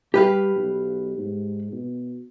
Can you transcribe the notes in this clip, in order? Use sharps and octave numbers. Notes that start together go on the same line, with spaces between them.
G3 G4 B4 F5
B1
G#2
B2